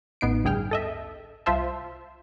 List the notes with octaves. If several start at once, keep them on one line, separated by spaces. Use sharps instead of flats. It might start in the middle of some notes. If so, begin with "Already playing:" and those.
A1 B3 D#4 C7 D7
D2 G2 G#4 G5 F6
A4 D#5 E5
C2 F4 C5 E5 A5